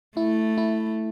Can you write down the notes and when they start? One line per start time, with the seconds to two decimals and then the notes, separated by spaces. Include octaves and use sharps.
0.17 A3 E4
0.58 E4